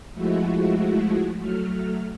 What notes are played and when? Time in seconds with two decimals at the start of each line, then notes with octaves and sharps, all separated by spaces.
0.14 F3 G#3 A3 E4 F#4
1.40 F#3 A3 F6